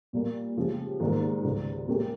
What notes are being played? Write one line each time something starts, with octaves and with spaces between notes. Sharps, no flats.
A#2 G3 A#3
C#3 F3 G#3 C#4 G4
G#2 D#3 G3 A#3
C#2 C#3 G3
A#2 G#3 C#4 G4 A#4